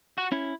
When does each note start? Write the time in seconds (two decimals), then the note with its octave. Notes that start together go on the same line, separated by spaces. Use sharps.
0.18 F#4
0.32 C#4 E4